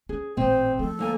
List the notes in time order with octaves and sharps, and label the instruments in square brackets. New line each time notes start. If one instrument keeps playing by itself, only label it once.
[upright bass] C#4 [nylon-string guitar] G#4
[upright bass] A1 A#2 [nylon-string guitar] C4 D#5 [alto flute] C5
[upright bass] F3 A3 [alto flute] A4
[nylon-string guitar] D2 A#3 G#5